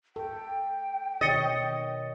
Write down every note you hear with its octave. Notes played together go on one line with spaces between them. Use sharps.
A4 G5
B2 D#3 C#5 D#5 A6 C#7